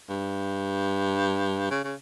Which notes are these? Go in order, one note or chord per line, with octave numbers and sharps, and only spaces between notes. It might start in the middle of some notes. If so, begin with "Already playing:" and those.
G2
C#3
C#3